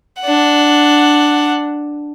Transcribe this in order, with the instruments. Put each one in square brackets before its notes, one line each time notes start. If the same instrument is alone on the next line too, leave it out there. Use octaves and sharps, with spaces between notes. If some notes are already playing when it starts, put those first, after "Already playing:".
[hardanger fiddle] D4 F#5